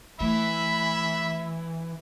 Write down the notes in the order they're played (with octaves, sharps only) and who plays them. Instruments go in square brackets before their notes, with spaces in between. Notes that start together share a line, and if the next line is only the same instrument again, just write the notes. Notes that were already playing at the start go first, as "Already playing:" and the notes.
[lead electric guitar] E3 [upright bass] A3 [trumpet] E5 [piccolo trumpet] B5